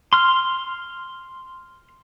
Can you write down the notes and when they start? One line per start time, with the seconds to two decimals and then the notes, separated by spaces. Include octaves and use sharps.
0.13 C6 F6